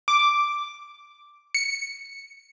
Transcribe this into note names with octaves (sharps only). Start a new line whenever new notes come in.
D6
C#7